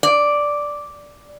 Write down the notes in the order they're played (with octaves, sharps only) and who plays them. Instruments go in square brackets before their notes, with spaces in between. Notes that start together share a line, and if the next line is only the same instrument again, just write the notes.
[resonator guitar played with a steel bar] D5